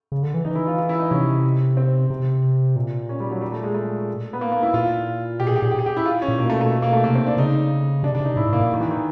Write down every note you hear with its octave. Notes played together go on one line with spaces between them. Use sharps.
C#3
D3
E3
E3 D#4
E4
F4
F4
E4
D#4
C3 C#4
C4
C3
A#2
C#4
G3
F#3
G3
A3
G#3
A3
B3
A#3
A#3
E4
A#2 F4
B2 G4
G#4
A#2
G4
A#2 G#4
G4
G#4
G4
E4
F4
C#4
A#2
B2 A#3
A3
A3
A#3
A3
C3 A#3
C4
D4
C#3 D#4
C3 D4
D4
C3 D#4
A2 E4
G#2
A2 A#3
A#2
D#3
E3
D#3